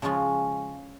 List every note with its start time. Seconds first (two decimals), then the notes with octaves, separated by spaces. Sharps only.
0.02 C#3 F3 G#3 C#4 F4